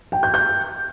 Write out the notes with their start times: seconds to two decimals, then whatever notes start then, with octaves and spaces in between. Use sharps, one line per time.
0.12 G5
0.23 G6
0.34 G6